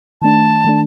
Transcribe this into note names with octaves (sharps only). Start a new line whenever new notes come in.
D#3 A3 D4 A5
D#3 A3 D4